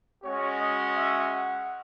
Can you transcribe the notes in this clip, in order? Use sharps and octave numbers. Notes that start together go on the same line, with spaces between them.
G#3 C#4 F#4 C#5
D#5
E5
F#5